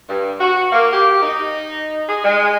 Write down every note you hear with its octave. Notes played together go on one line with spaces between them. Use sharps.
G2
F#4
A#3
G4
D#4
G#4
G#3